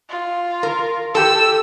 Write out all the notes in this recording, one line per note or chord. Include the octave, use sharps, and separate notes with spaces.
F4
A#4
G4 A4 E6